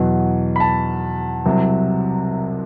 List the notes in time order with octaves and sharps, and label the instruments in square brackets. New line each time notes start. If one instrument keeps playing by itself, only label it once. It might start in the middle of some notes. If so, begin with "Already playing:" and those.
Already playing: [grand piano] E2 B2 F#3
B5
A5
C2 C3 F#3